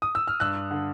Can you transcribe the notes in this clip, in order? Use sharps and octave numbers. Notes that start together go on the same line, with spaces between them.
D#6
E6
F6
G2 E6 F#6
D3